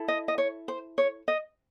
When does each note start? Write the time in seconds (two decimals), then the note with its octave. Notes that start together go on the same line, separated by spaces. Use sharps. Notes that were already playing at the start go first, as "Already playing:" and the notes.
Already playing: E4 A4
0.08 D#5
0.28 D#5
0.38 C#5
0.68 C5
0.98 C#5
1.28 D#5